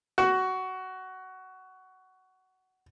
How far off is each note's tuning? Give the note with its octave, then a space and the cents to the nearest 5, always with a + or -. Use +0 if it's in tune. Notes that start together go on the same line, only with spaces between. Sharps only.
F#4 +15